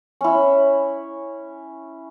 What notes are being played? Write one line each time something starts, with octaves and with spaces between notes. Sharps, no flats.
C#4 E4